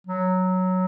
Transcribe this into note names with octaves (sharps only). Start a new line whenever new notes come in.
F#3